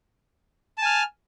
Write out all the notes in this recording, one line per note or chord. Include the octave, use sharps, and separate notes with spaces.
G#5 A5 F6